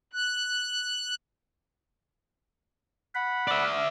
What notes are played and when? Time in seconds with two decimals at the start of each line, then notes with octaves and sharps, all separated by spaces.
0.13 F#6
3.15 F#5 B5
3.47 D5 E5